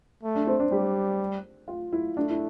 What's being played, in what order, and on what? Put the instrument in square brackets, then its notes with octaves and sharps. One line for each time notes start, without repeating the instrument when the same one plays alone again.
[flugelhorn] A3
[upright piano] D4
C4
D4
[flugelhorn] G3 [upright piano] G4
[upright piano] F4
E4
[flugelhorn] A3 [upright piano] D4
[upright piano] E4